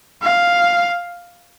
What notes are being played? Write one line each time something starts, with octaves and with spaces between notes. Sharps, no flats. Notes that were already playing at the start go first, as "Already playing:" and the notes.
F5